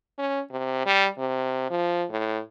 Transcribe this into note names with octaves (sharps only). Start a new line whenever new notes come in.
C#4
C3
G3
C3
F3
A2